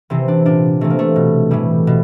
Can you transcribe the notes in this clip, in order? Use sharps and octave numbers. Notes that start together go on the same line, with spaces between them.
C3 E3 C4
D4
A#2 D4
C3 E3 A3
A#3
A3
B2
A2 E3 G3
B2